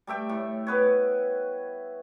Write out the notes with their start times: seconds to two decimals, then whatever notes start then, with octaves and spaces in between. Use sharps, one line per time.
0.07 G3 A3 E5 G5
0.29 A2
0.67 B3 B4 C#5